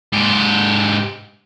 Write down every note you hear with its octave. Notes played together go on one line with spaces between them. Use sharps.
G#2 G4